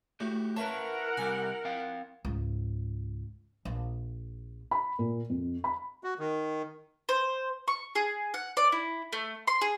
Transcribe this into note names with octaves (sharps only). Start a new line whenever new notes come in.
A2 F#4 G4
E4 A#4 B4 C#5 E5 F#5 A5
C3 G3 G4 G#5
C4 F5 G5
C#2 G#2
A#1
B5
A#2
F2
B5
F#4
D#3
C5
C#6
G#4
F#5
D5
E4
A3
C6
G#4